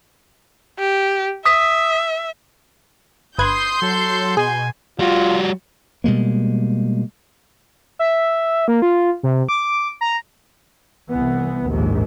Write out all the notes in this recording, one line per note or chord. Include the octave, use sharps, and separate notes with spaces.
G4
E5 D#6 B6
G1 B4 C6 D#6 G6 G#6
F#3 A4
B2 G#4 G#5
G3 F4 F#4
B2 G3 G#3 A#3
E5
A#3
F4
C3
D6
A#5
C2 E3 B3
A#1 D#2 G#2